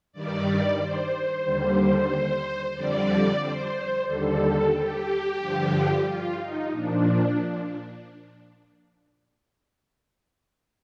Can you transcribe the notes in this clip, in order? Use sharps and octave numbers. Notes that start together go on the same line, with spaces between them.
G2 D#3 G3 D5
C5
D#2 D3 G3
F2 D3 G3 D5
C5
D#2 D3 G3 A4
G4
G2 D3 F3
F4
D#4
A#2 F3 D4